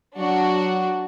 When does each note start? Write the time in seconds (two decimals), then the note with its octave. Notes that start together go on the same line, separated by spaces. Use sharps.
0.17 F#3 D4 F#4